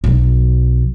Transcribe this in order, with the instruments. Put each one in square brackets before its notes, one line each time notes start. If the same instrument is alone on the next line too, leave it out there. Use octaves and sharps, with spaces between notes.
[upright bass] B1 F#3